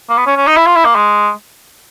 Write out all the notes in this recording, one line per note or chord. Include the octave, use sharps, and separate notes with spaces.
A#3
B3
C#4
C#4
D#4
E4
F4
E4
A#3
G#3